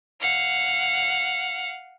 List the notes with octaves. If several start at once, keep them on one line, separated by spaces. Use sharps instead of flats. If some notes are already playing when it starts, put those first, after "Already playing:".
F5 F#5